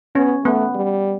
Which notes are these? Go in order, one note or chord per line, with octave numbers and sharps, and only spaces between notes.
B3 C#4
A3 B3
G3